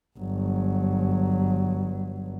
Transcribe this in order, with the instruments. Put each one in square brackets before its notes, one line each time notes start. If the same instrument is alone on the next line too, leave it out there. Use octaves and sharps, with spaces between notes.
[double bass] G1 F#3